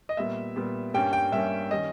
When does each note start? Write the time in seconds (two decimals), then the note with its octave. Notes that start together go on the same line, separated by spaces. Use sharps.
0.09 D#5
0.17 A#2 G3 B3 E5
0.56 A#2 G3 B3
0.94 G2 G3 A#3 C#4 G5
1.13 G5
1.32 G2 G3 A#3 C#4 E5
1.71 D#3 G3 C#4 D#5